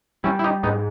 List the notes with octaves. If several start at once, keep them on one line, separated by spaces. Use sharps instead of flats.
G3 C#4 E4
E4
D#4 G4
G#2 B3 D#4